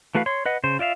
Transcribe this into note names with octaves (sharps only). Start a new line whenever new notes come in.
E3 A3 F#4 B4 F5
C#5 C6
B4 D#5 F#5
C#3 C5
F4 D5 E5 F5